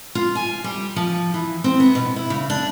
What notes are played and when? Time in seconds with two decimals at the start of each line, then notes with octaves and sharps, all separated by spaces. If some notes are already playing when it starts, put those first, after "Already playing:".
0.15 F4
0.35 G#5
0.64 G3
0.96 F3
1.34 E3
1.64 C4
1.80 B3
1.95 B2
2.16 E4
2.30 C#3
2.50 D4